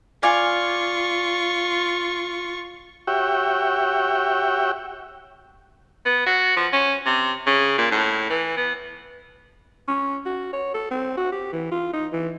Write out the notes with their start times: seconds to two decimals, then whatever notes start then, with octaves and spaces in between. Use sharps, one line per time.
0.23 F4 D5 F5 G#5 C#6
3.07 F#4 G4 C#5 E5 G5
6.05 B3
6.26 F#4
6.56 F3
6.72 C#4
7.06 C3
7.46 C#3
7.78 A#2
7.92 A2
8.30 E3
8.57 B3
9.88 C#4
10.26 F#4
10.53 C#5
10.74 A4
10.91 C4
11.17 F#4
11.32 G4
11.53 E3
11.72 F4
11.94 D#4
12.13 E3